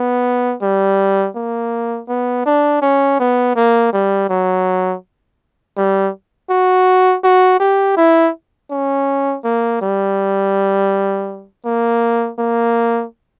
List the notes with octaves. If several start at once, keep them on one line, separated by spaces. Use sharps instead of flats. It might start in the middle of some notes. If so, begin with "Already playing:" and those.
Already playing: B3
G3
A#3
B3
D4
C#4
B3
A#3
G3
F#3
G3
F#4
F#4
G4
E4
C#4
A#3
G3
A#3
A#3